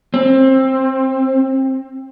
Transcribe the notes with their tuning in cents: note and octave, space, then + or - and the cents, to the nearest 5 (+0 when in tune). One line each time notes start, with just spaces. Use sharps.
C4 +20